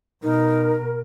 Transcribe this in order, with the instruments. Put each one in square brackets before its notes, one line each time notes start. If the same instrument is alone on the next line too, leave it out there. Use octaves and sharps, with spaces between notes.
[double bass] B2 [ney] D#4 [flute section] A#4